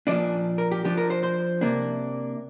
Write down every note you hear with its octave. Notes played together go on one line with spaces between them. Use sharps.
A#2 F3 D4 D5
A#4
G4
F3 D4 G4
A#4
C5
C5
C3 A#3 D4